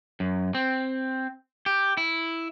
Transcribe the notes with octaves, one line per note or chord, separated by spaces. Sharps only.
F#2
C4
G4
E4